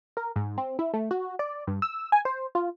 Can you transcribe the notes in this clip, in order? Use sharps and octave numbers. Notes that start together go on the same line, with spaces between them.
A#4
G#2
C4
E4
A3
F#4
D5
G2
E6
G#5
C5
F4